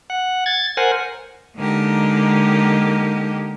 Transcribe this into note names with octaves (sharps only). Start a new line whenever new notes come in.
F#5
G#6 A6
A#4 C5 F#5 G#5
D3 G#3 A#3 D#4 G4